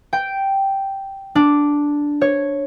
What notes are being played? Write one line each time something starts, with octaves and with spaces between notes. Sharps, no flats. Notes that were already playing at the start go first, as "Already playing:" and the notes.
G5
D4
C#5